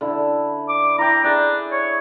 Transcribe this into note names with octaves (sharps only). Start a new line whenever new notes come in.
D3 E4
D6
E4 G5 A#5
D4 G#4 D5
C#5